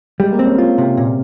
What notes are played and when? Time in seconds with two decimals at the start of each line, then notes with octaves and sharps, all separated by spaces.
0.20 G3 G#3
0.32 A#3
0.39 C4
0.46 C#4
0.58 F4
0.78 C3
0.97 A#2